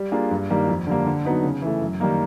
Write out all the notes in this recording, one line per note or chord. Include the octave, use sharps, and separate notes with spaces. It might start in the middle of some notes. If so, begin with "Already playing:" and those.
Already playing: G3
A#3 D4 F4 G#4
G2
D#3 G3 A#3
F2
D3 G3 A#3
D3
F#3 B3 D#4
C#3
E3 A3
F#2
D#3 G3 A#3 D#4